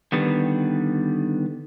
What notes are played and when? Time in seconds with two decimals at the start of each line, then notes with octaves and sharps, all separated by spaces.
0.12 D3 D#3 G3 B3